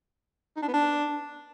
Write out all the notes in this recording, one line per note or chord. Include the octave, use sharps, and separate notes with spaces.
D#4
D4
B3
D4